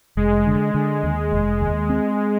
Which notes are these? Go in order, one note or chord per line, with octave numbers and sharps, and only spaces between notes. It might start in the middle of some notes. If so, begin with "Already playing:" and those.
F1 G#3
D3
D3
D#2
F1
D#2
C4